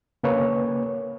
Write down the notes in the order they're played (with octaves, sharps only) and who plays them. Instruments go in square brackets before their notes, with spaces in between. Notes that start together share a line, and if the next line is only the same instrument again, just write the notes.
[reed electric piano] C#3 A#3 B4 C#5